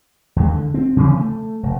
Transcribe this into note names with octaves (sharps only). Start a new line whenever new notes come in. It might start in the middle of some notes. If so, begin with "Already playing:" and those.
D#2 G#3
D3
C4
C3 E3 F3 C#4
A3
F1